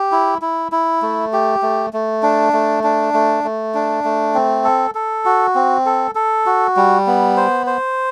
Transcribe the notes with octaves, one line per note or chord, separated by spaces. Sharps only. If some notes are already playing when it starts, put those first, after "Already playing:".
Already playing: G4
E4
E4
E4
A3
G4
A3
A3
D4
A3
D4
A3
A3
D4
A3
C4
A4
A4
F#4
C4
A4
A4
F#4
G3
B3
C5
C5